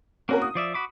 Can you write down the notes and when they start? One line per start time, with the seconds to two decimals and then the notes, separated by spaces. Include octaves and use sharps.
0.29 A#3 C4 C#4 F#4 A#4
0.42 D#6
0.55 F3 D5 E5
0.74 F#4 B5 D6